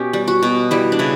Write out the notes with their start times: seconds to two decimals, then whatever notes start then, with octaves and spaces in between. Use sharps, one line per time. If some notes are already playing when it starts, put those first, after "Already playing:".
Already playing: B2 C#4 G4
0.13 G3
0.28 F#4
0.43 B2
0.71 G3 E4
0.92 D4
0.99 C#3 E4